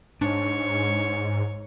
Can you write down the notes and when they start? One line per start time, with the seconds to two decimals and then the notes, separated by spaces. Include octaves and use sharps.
0.21 G#2 D4 C#5 C#6